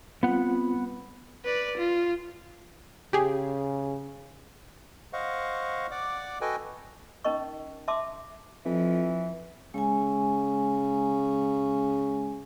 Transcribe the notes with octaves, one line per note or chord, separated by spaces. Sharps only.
G3 B3 C4 F4 F#5
B4 D5
F4
C#3 G4 G#4
C5 D#5 F5 F#5 C#6
D5 F#5 D6
F#4 A4 B4 D#5 G5 G#5
C#4 D#4 A#4 D#5 C#6
E5 A5 C6 D6
F2 E3 F3
C#3 G#3 G#5